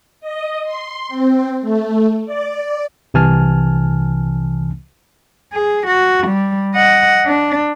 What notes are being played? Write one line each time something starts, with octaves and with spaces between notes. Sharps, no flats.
D#5
C6
C4
A3
D5
C2 C3 E3 G#5 A5 F6
G#4
F#4
G3
D#5 F#5
D4